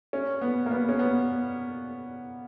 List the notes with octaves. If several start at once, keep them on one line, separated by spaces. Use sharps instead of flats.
C#4
B3
A#3
B3
C#4
B3